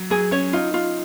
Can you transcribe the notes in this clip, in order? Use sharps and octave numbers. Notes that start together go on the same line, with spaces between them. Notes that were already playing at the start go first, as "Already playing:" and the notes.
Already playing: F#3
F#3 G#4
C#4 C#5
D#4 F4
F4